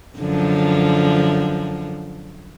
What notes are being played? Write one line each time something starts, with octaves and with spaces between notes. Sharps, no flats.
F#2 D3 F3